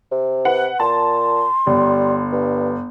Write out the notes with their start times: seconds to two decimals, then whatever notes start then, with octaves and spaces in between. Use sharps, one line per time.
0.11 C3
0.45 B4 F#5
0.80 A#2 A5 C6
1.67 G1 G3
2.32 G2